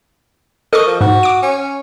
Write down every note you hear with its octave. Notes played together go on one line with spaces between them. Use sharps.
A4 A#4 D#5 C#6
F3
G#2 F#4
D6 D7
C#4